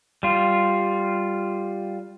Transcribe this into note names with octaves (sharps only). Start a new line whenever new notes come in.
G3 F4